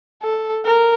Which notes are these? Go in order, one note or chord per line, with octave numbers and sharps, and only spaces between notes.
A4
A#4